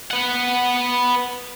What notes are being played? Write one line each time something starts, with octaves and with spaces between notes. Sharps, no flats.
B4 F#5